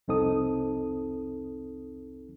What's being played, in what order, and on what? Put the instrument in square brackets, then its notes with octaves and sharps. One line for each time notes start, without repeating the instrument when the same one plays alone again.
[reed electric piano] C2 F2 C4 D#4 A4 D#6